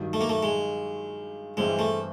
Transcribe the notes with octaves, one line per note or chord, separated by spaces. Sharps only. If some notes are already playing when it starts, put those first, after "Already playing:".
Already playing: G2 D#3 F#3
A3
A#3
A3
G#3
G2 E3 G3 G#3 C4 E4
A3